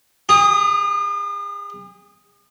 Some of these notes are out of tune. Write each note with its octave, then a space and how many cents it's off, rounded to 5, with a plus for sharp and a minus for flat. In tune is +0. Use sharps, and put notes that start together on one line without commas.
G#4 -45 D#6 +0